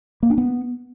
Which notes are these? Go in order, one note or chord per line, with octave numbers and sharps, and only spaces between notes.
A#3
D4
B3